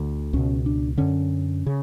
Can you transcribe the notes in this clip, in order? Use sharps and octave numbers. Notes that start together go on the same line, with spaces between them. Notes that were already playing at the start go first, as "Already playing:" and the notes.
Already playing: D2 D3
C#2 B2 C#4
D4
F#2 D3 C#4
C#3